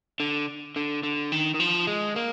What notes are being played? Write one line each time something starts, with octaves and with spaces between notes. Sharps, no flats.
D3
D3
D3
D#3
D#3
F3
G#3
A#3